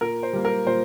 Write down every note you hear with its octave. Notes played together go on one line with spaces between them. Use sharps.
A#2 A#4
C5
G3 A#3
A#4
A#2 C5